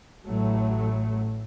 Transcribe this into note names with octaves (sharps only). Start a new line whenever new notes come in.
A1 A2 F#3 A3